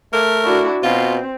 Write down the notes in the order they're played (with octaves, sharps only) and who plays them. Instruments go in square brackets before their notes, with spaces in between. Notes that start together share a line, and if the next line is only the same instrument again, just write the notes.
[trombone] A3 [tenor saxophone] A#4
[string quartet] D4 E4 F#4
[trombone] B2 [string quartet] C4 [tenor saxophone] F4